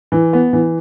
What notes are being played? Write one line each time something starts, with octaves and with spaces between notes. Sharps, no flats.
E3
B3
E3